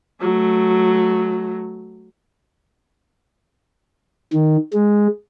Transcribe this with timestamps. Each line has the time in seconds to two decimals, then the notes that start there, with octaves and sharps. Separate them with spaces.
0.22 F#3 A3
4.33 D#3
4.73 G#3